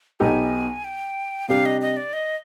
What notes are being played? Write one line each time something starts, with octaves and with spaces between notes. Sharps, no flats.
B1 B2 B3 D#4 G4 G#5
G5
C3 G3 D4 G4 F5
D#5
D#5
D5
D#5